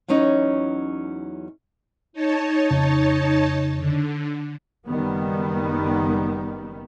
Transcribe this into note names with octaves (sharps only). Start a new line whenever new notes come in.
E2 F#3 C#4 D#4 C#5
D#4 C#5 A5
F2 C#3
D3
F#1 D#3 G3 B3